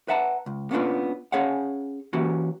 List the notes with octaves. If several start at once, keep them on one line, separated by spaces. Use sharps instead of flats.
B4 E5 F#5 A5 A#5
C#2
A#3 B3 C#4 D4 F4 B4
C#4 G#4 C#5 F5 F#5
E3 A#3 C#4 F#4 G4